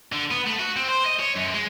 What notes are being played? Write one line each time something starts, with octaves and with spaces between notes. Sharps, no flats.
D3
B3
A3
F#4
C4
C5
D#5
C#5
F#2
G#3